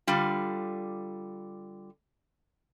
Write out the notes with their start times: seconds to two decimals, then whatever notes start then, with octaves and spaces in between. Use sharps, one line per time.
0.07 D3 G3 F4